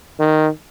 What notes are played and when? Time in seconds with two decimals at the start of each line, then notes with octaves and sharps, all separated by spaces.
0.20 D#3